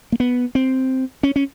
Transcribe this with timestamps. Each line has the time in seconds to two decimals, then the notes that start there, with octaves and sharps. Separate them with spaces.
0.12 A#3
0.20 B3
0.55 C4
1.23 C#4
1.36 C#4